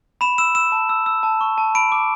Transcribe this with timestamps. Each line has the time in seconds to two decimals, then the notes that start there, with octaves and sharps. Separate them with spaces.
0.21 B5 E7
0.38 E6 E7
0.55 E6 E7
0.72 A5
0.89 E6
1.06 E6
1.23 A5
1.41 C#6
1.58 A5
1.75 B5 D7
1.92 D6